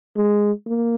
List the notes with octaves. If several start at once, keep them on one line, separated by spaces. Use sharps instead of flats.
G#3
A#3